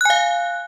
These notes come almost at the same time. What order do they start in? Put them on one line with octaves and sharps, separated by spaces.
F#6 G#5 F5